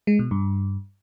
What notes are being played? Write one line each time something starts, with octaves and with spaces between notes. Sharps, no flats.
G#3
B2
G2